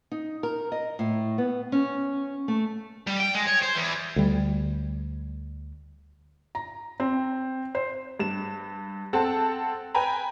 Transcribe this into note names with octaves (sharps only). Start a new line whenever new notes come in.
D#4
A#4
D#5
A2
B3
C#4
A3
G3
G5
G#3
C#5
C5
E2
D2 G3
A#5
C4
C5
G2 E7
C4 A4 F#5 A5
B4 G5 G#5 A#5 B5